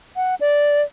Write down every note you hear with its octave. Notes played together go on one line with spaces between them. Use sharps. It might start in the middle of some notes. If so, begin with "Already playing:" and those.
F#5
D5